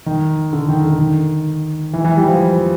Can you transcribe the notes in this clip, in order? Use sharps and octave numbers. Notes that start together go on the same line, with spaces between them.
D#3
D3
D#3
D3
D#3
E3
E3
G3
F3